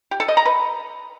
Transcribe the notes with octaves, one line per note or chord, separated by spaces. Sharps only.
G4
A4
D#5
A#5
B4